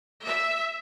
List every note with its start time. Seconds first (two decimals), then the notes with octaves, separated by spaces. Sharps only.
0.23 E5